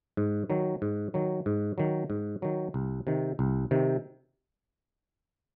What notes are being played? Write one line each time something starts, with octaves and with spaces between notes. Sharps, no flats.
G#2
D#3 F#3
G#2
D#3 F#3
G#2
D#3 F#3
G#2
D#3 F#3
C2
C3 D#3
C2
C3 D#3